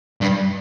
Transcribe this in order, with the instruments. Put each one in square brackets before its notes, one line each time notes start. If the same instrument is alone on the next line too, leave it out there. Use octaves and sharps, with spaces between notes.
[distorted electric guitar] G2